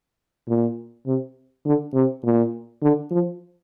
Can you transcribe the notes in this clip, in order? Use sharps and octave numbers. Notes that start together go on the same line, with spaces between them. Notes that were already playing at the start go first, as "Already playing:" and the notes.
A#2
C3
D3
C3
A#2
D3
F3